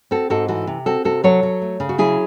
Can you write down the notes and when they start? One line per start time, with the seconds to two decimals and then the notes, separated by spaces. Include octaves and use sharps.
0.11 C4 F#4 A4
0.30 G#2 F#4 A4
0.48 E3 F#4 A4
0.67 C3
0.86 C4 F#4 A4
1.05 C3 F#4 A4
1.24 F#3 A4 C#5
1.43 F#3
1.62 A3
1.80 C#3
1.89 F#4
1.98 F#3 E4 G#4